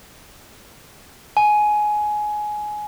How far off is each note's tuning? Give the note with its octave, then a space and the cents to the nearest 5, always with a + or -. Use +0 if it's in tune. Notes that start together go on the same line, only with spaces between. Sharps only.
G#5 +15